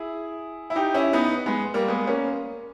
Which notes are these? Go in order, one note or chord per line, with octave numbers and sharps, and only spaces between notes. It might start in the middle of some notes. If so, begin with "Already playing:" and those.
Already playing: E4 G#4
E4
D#4 G4
C#4 E4
B3 D#4
G#3 B3
G3 A#3
G#3 B3
A#3 C#4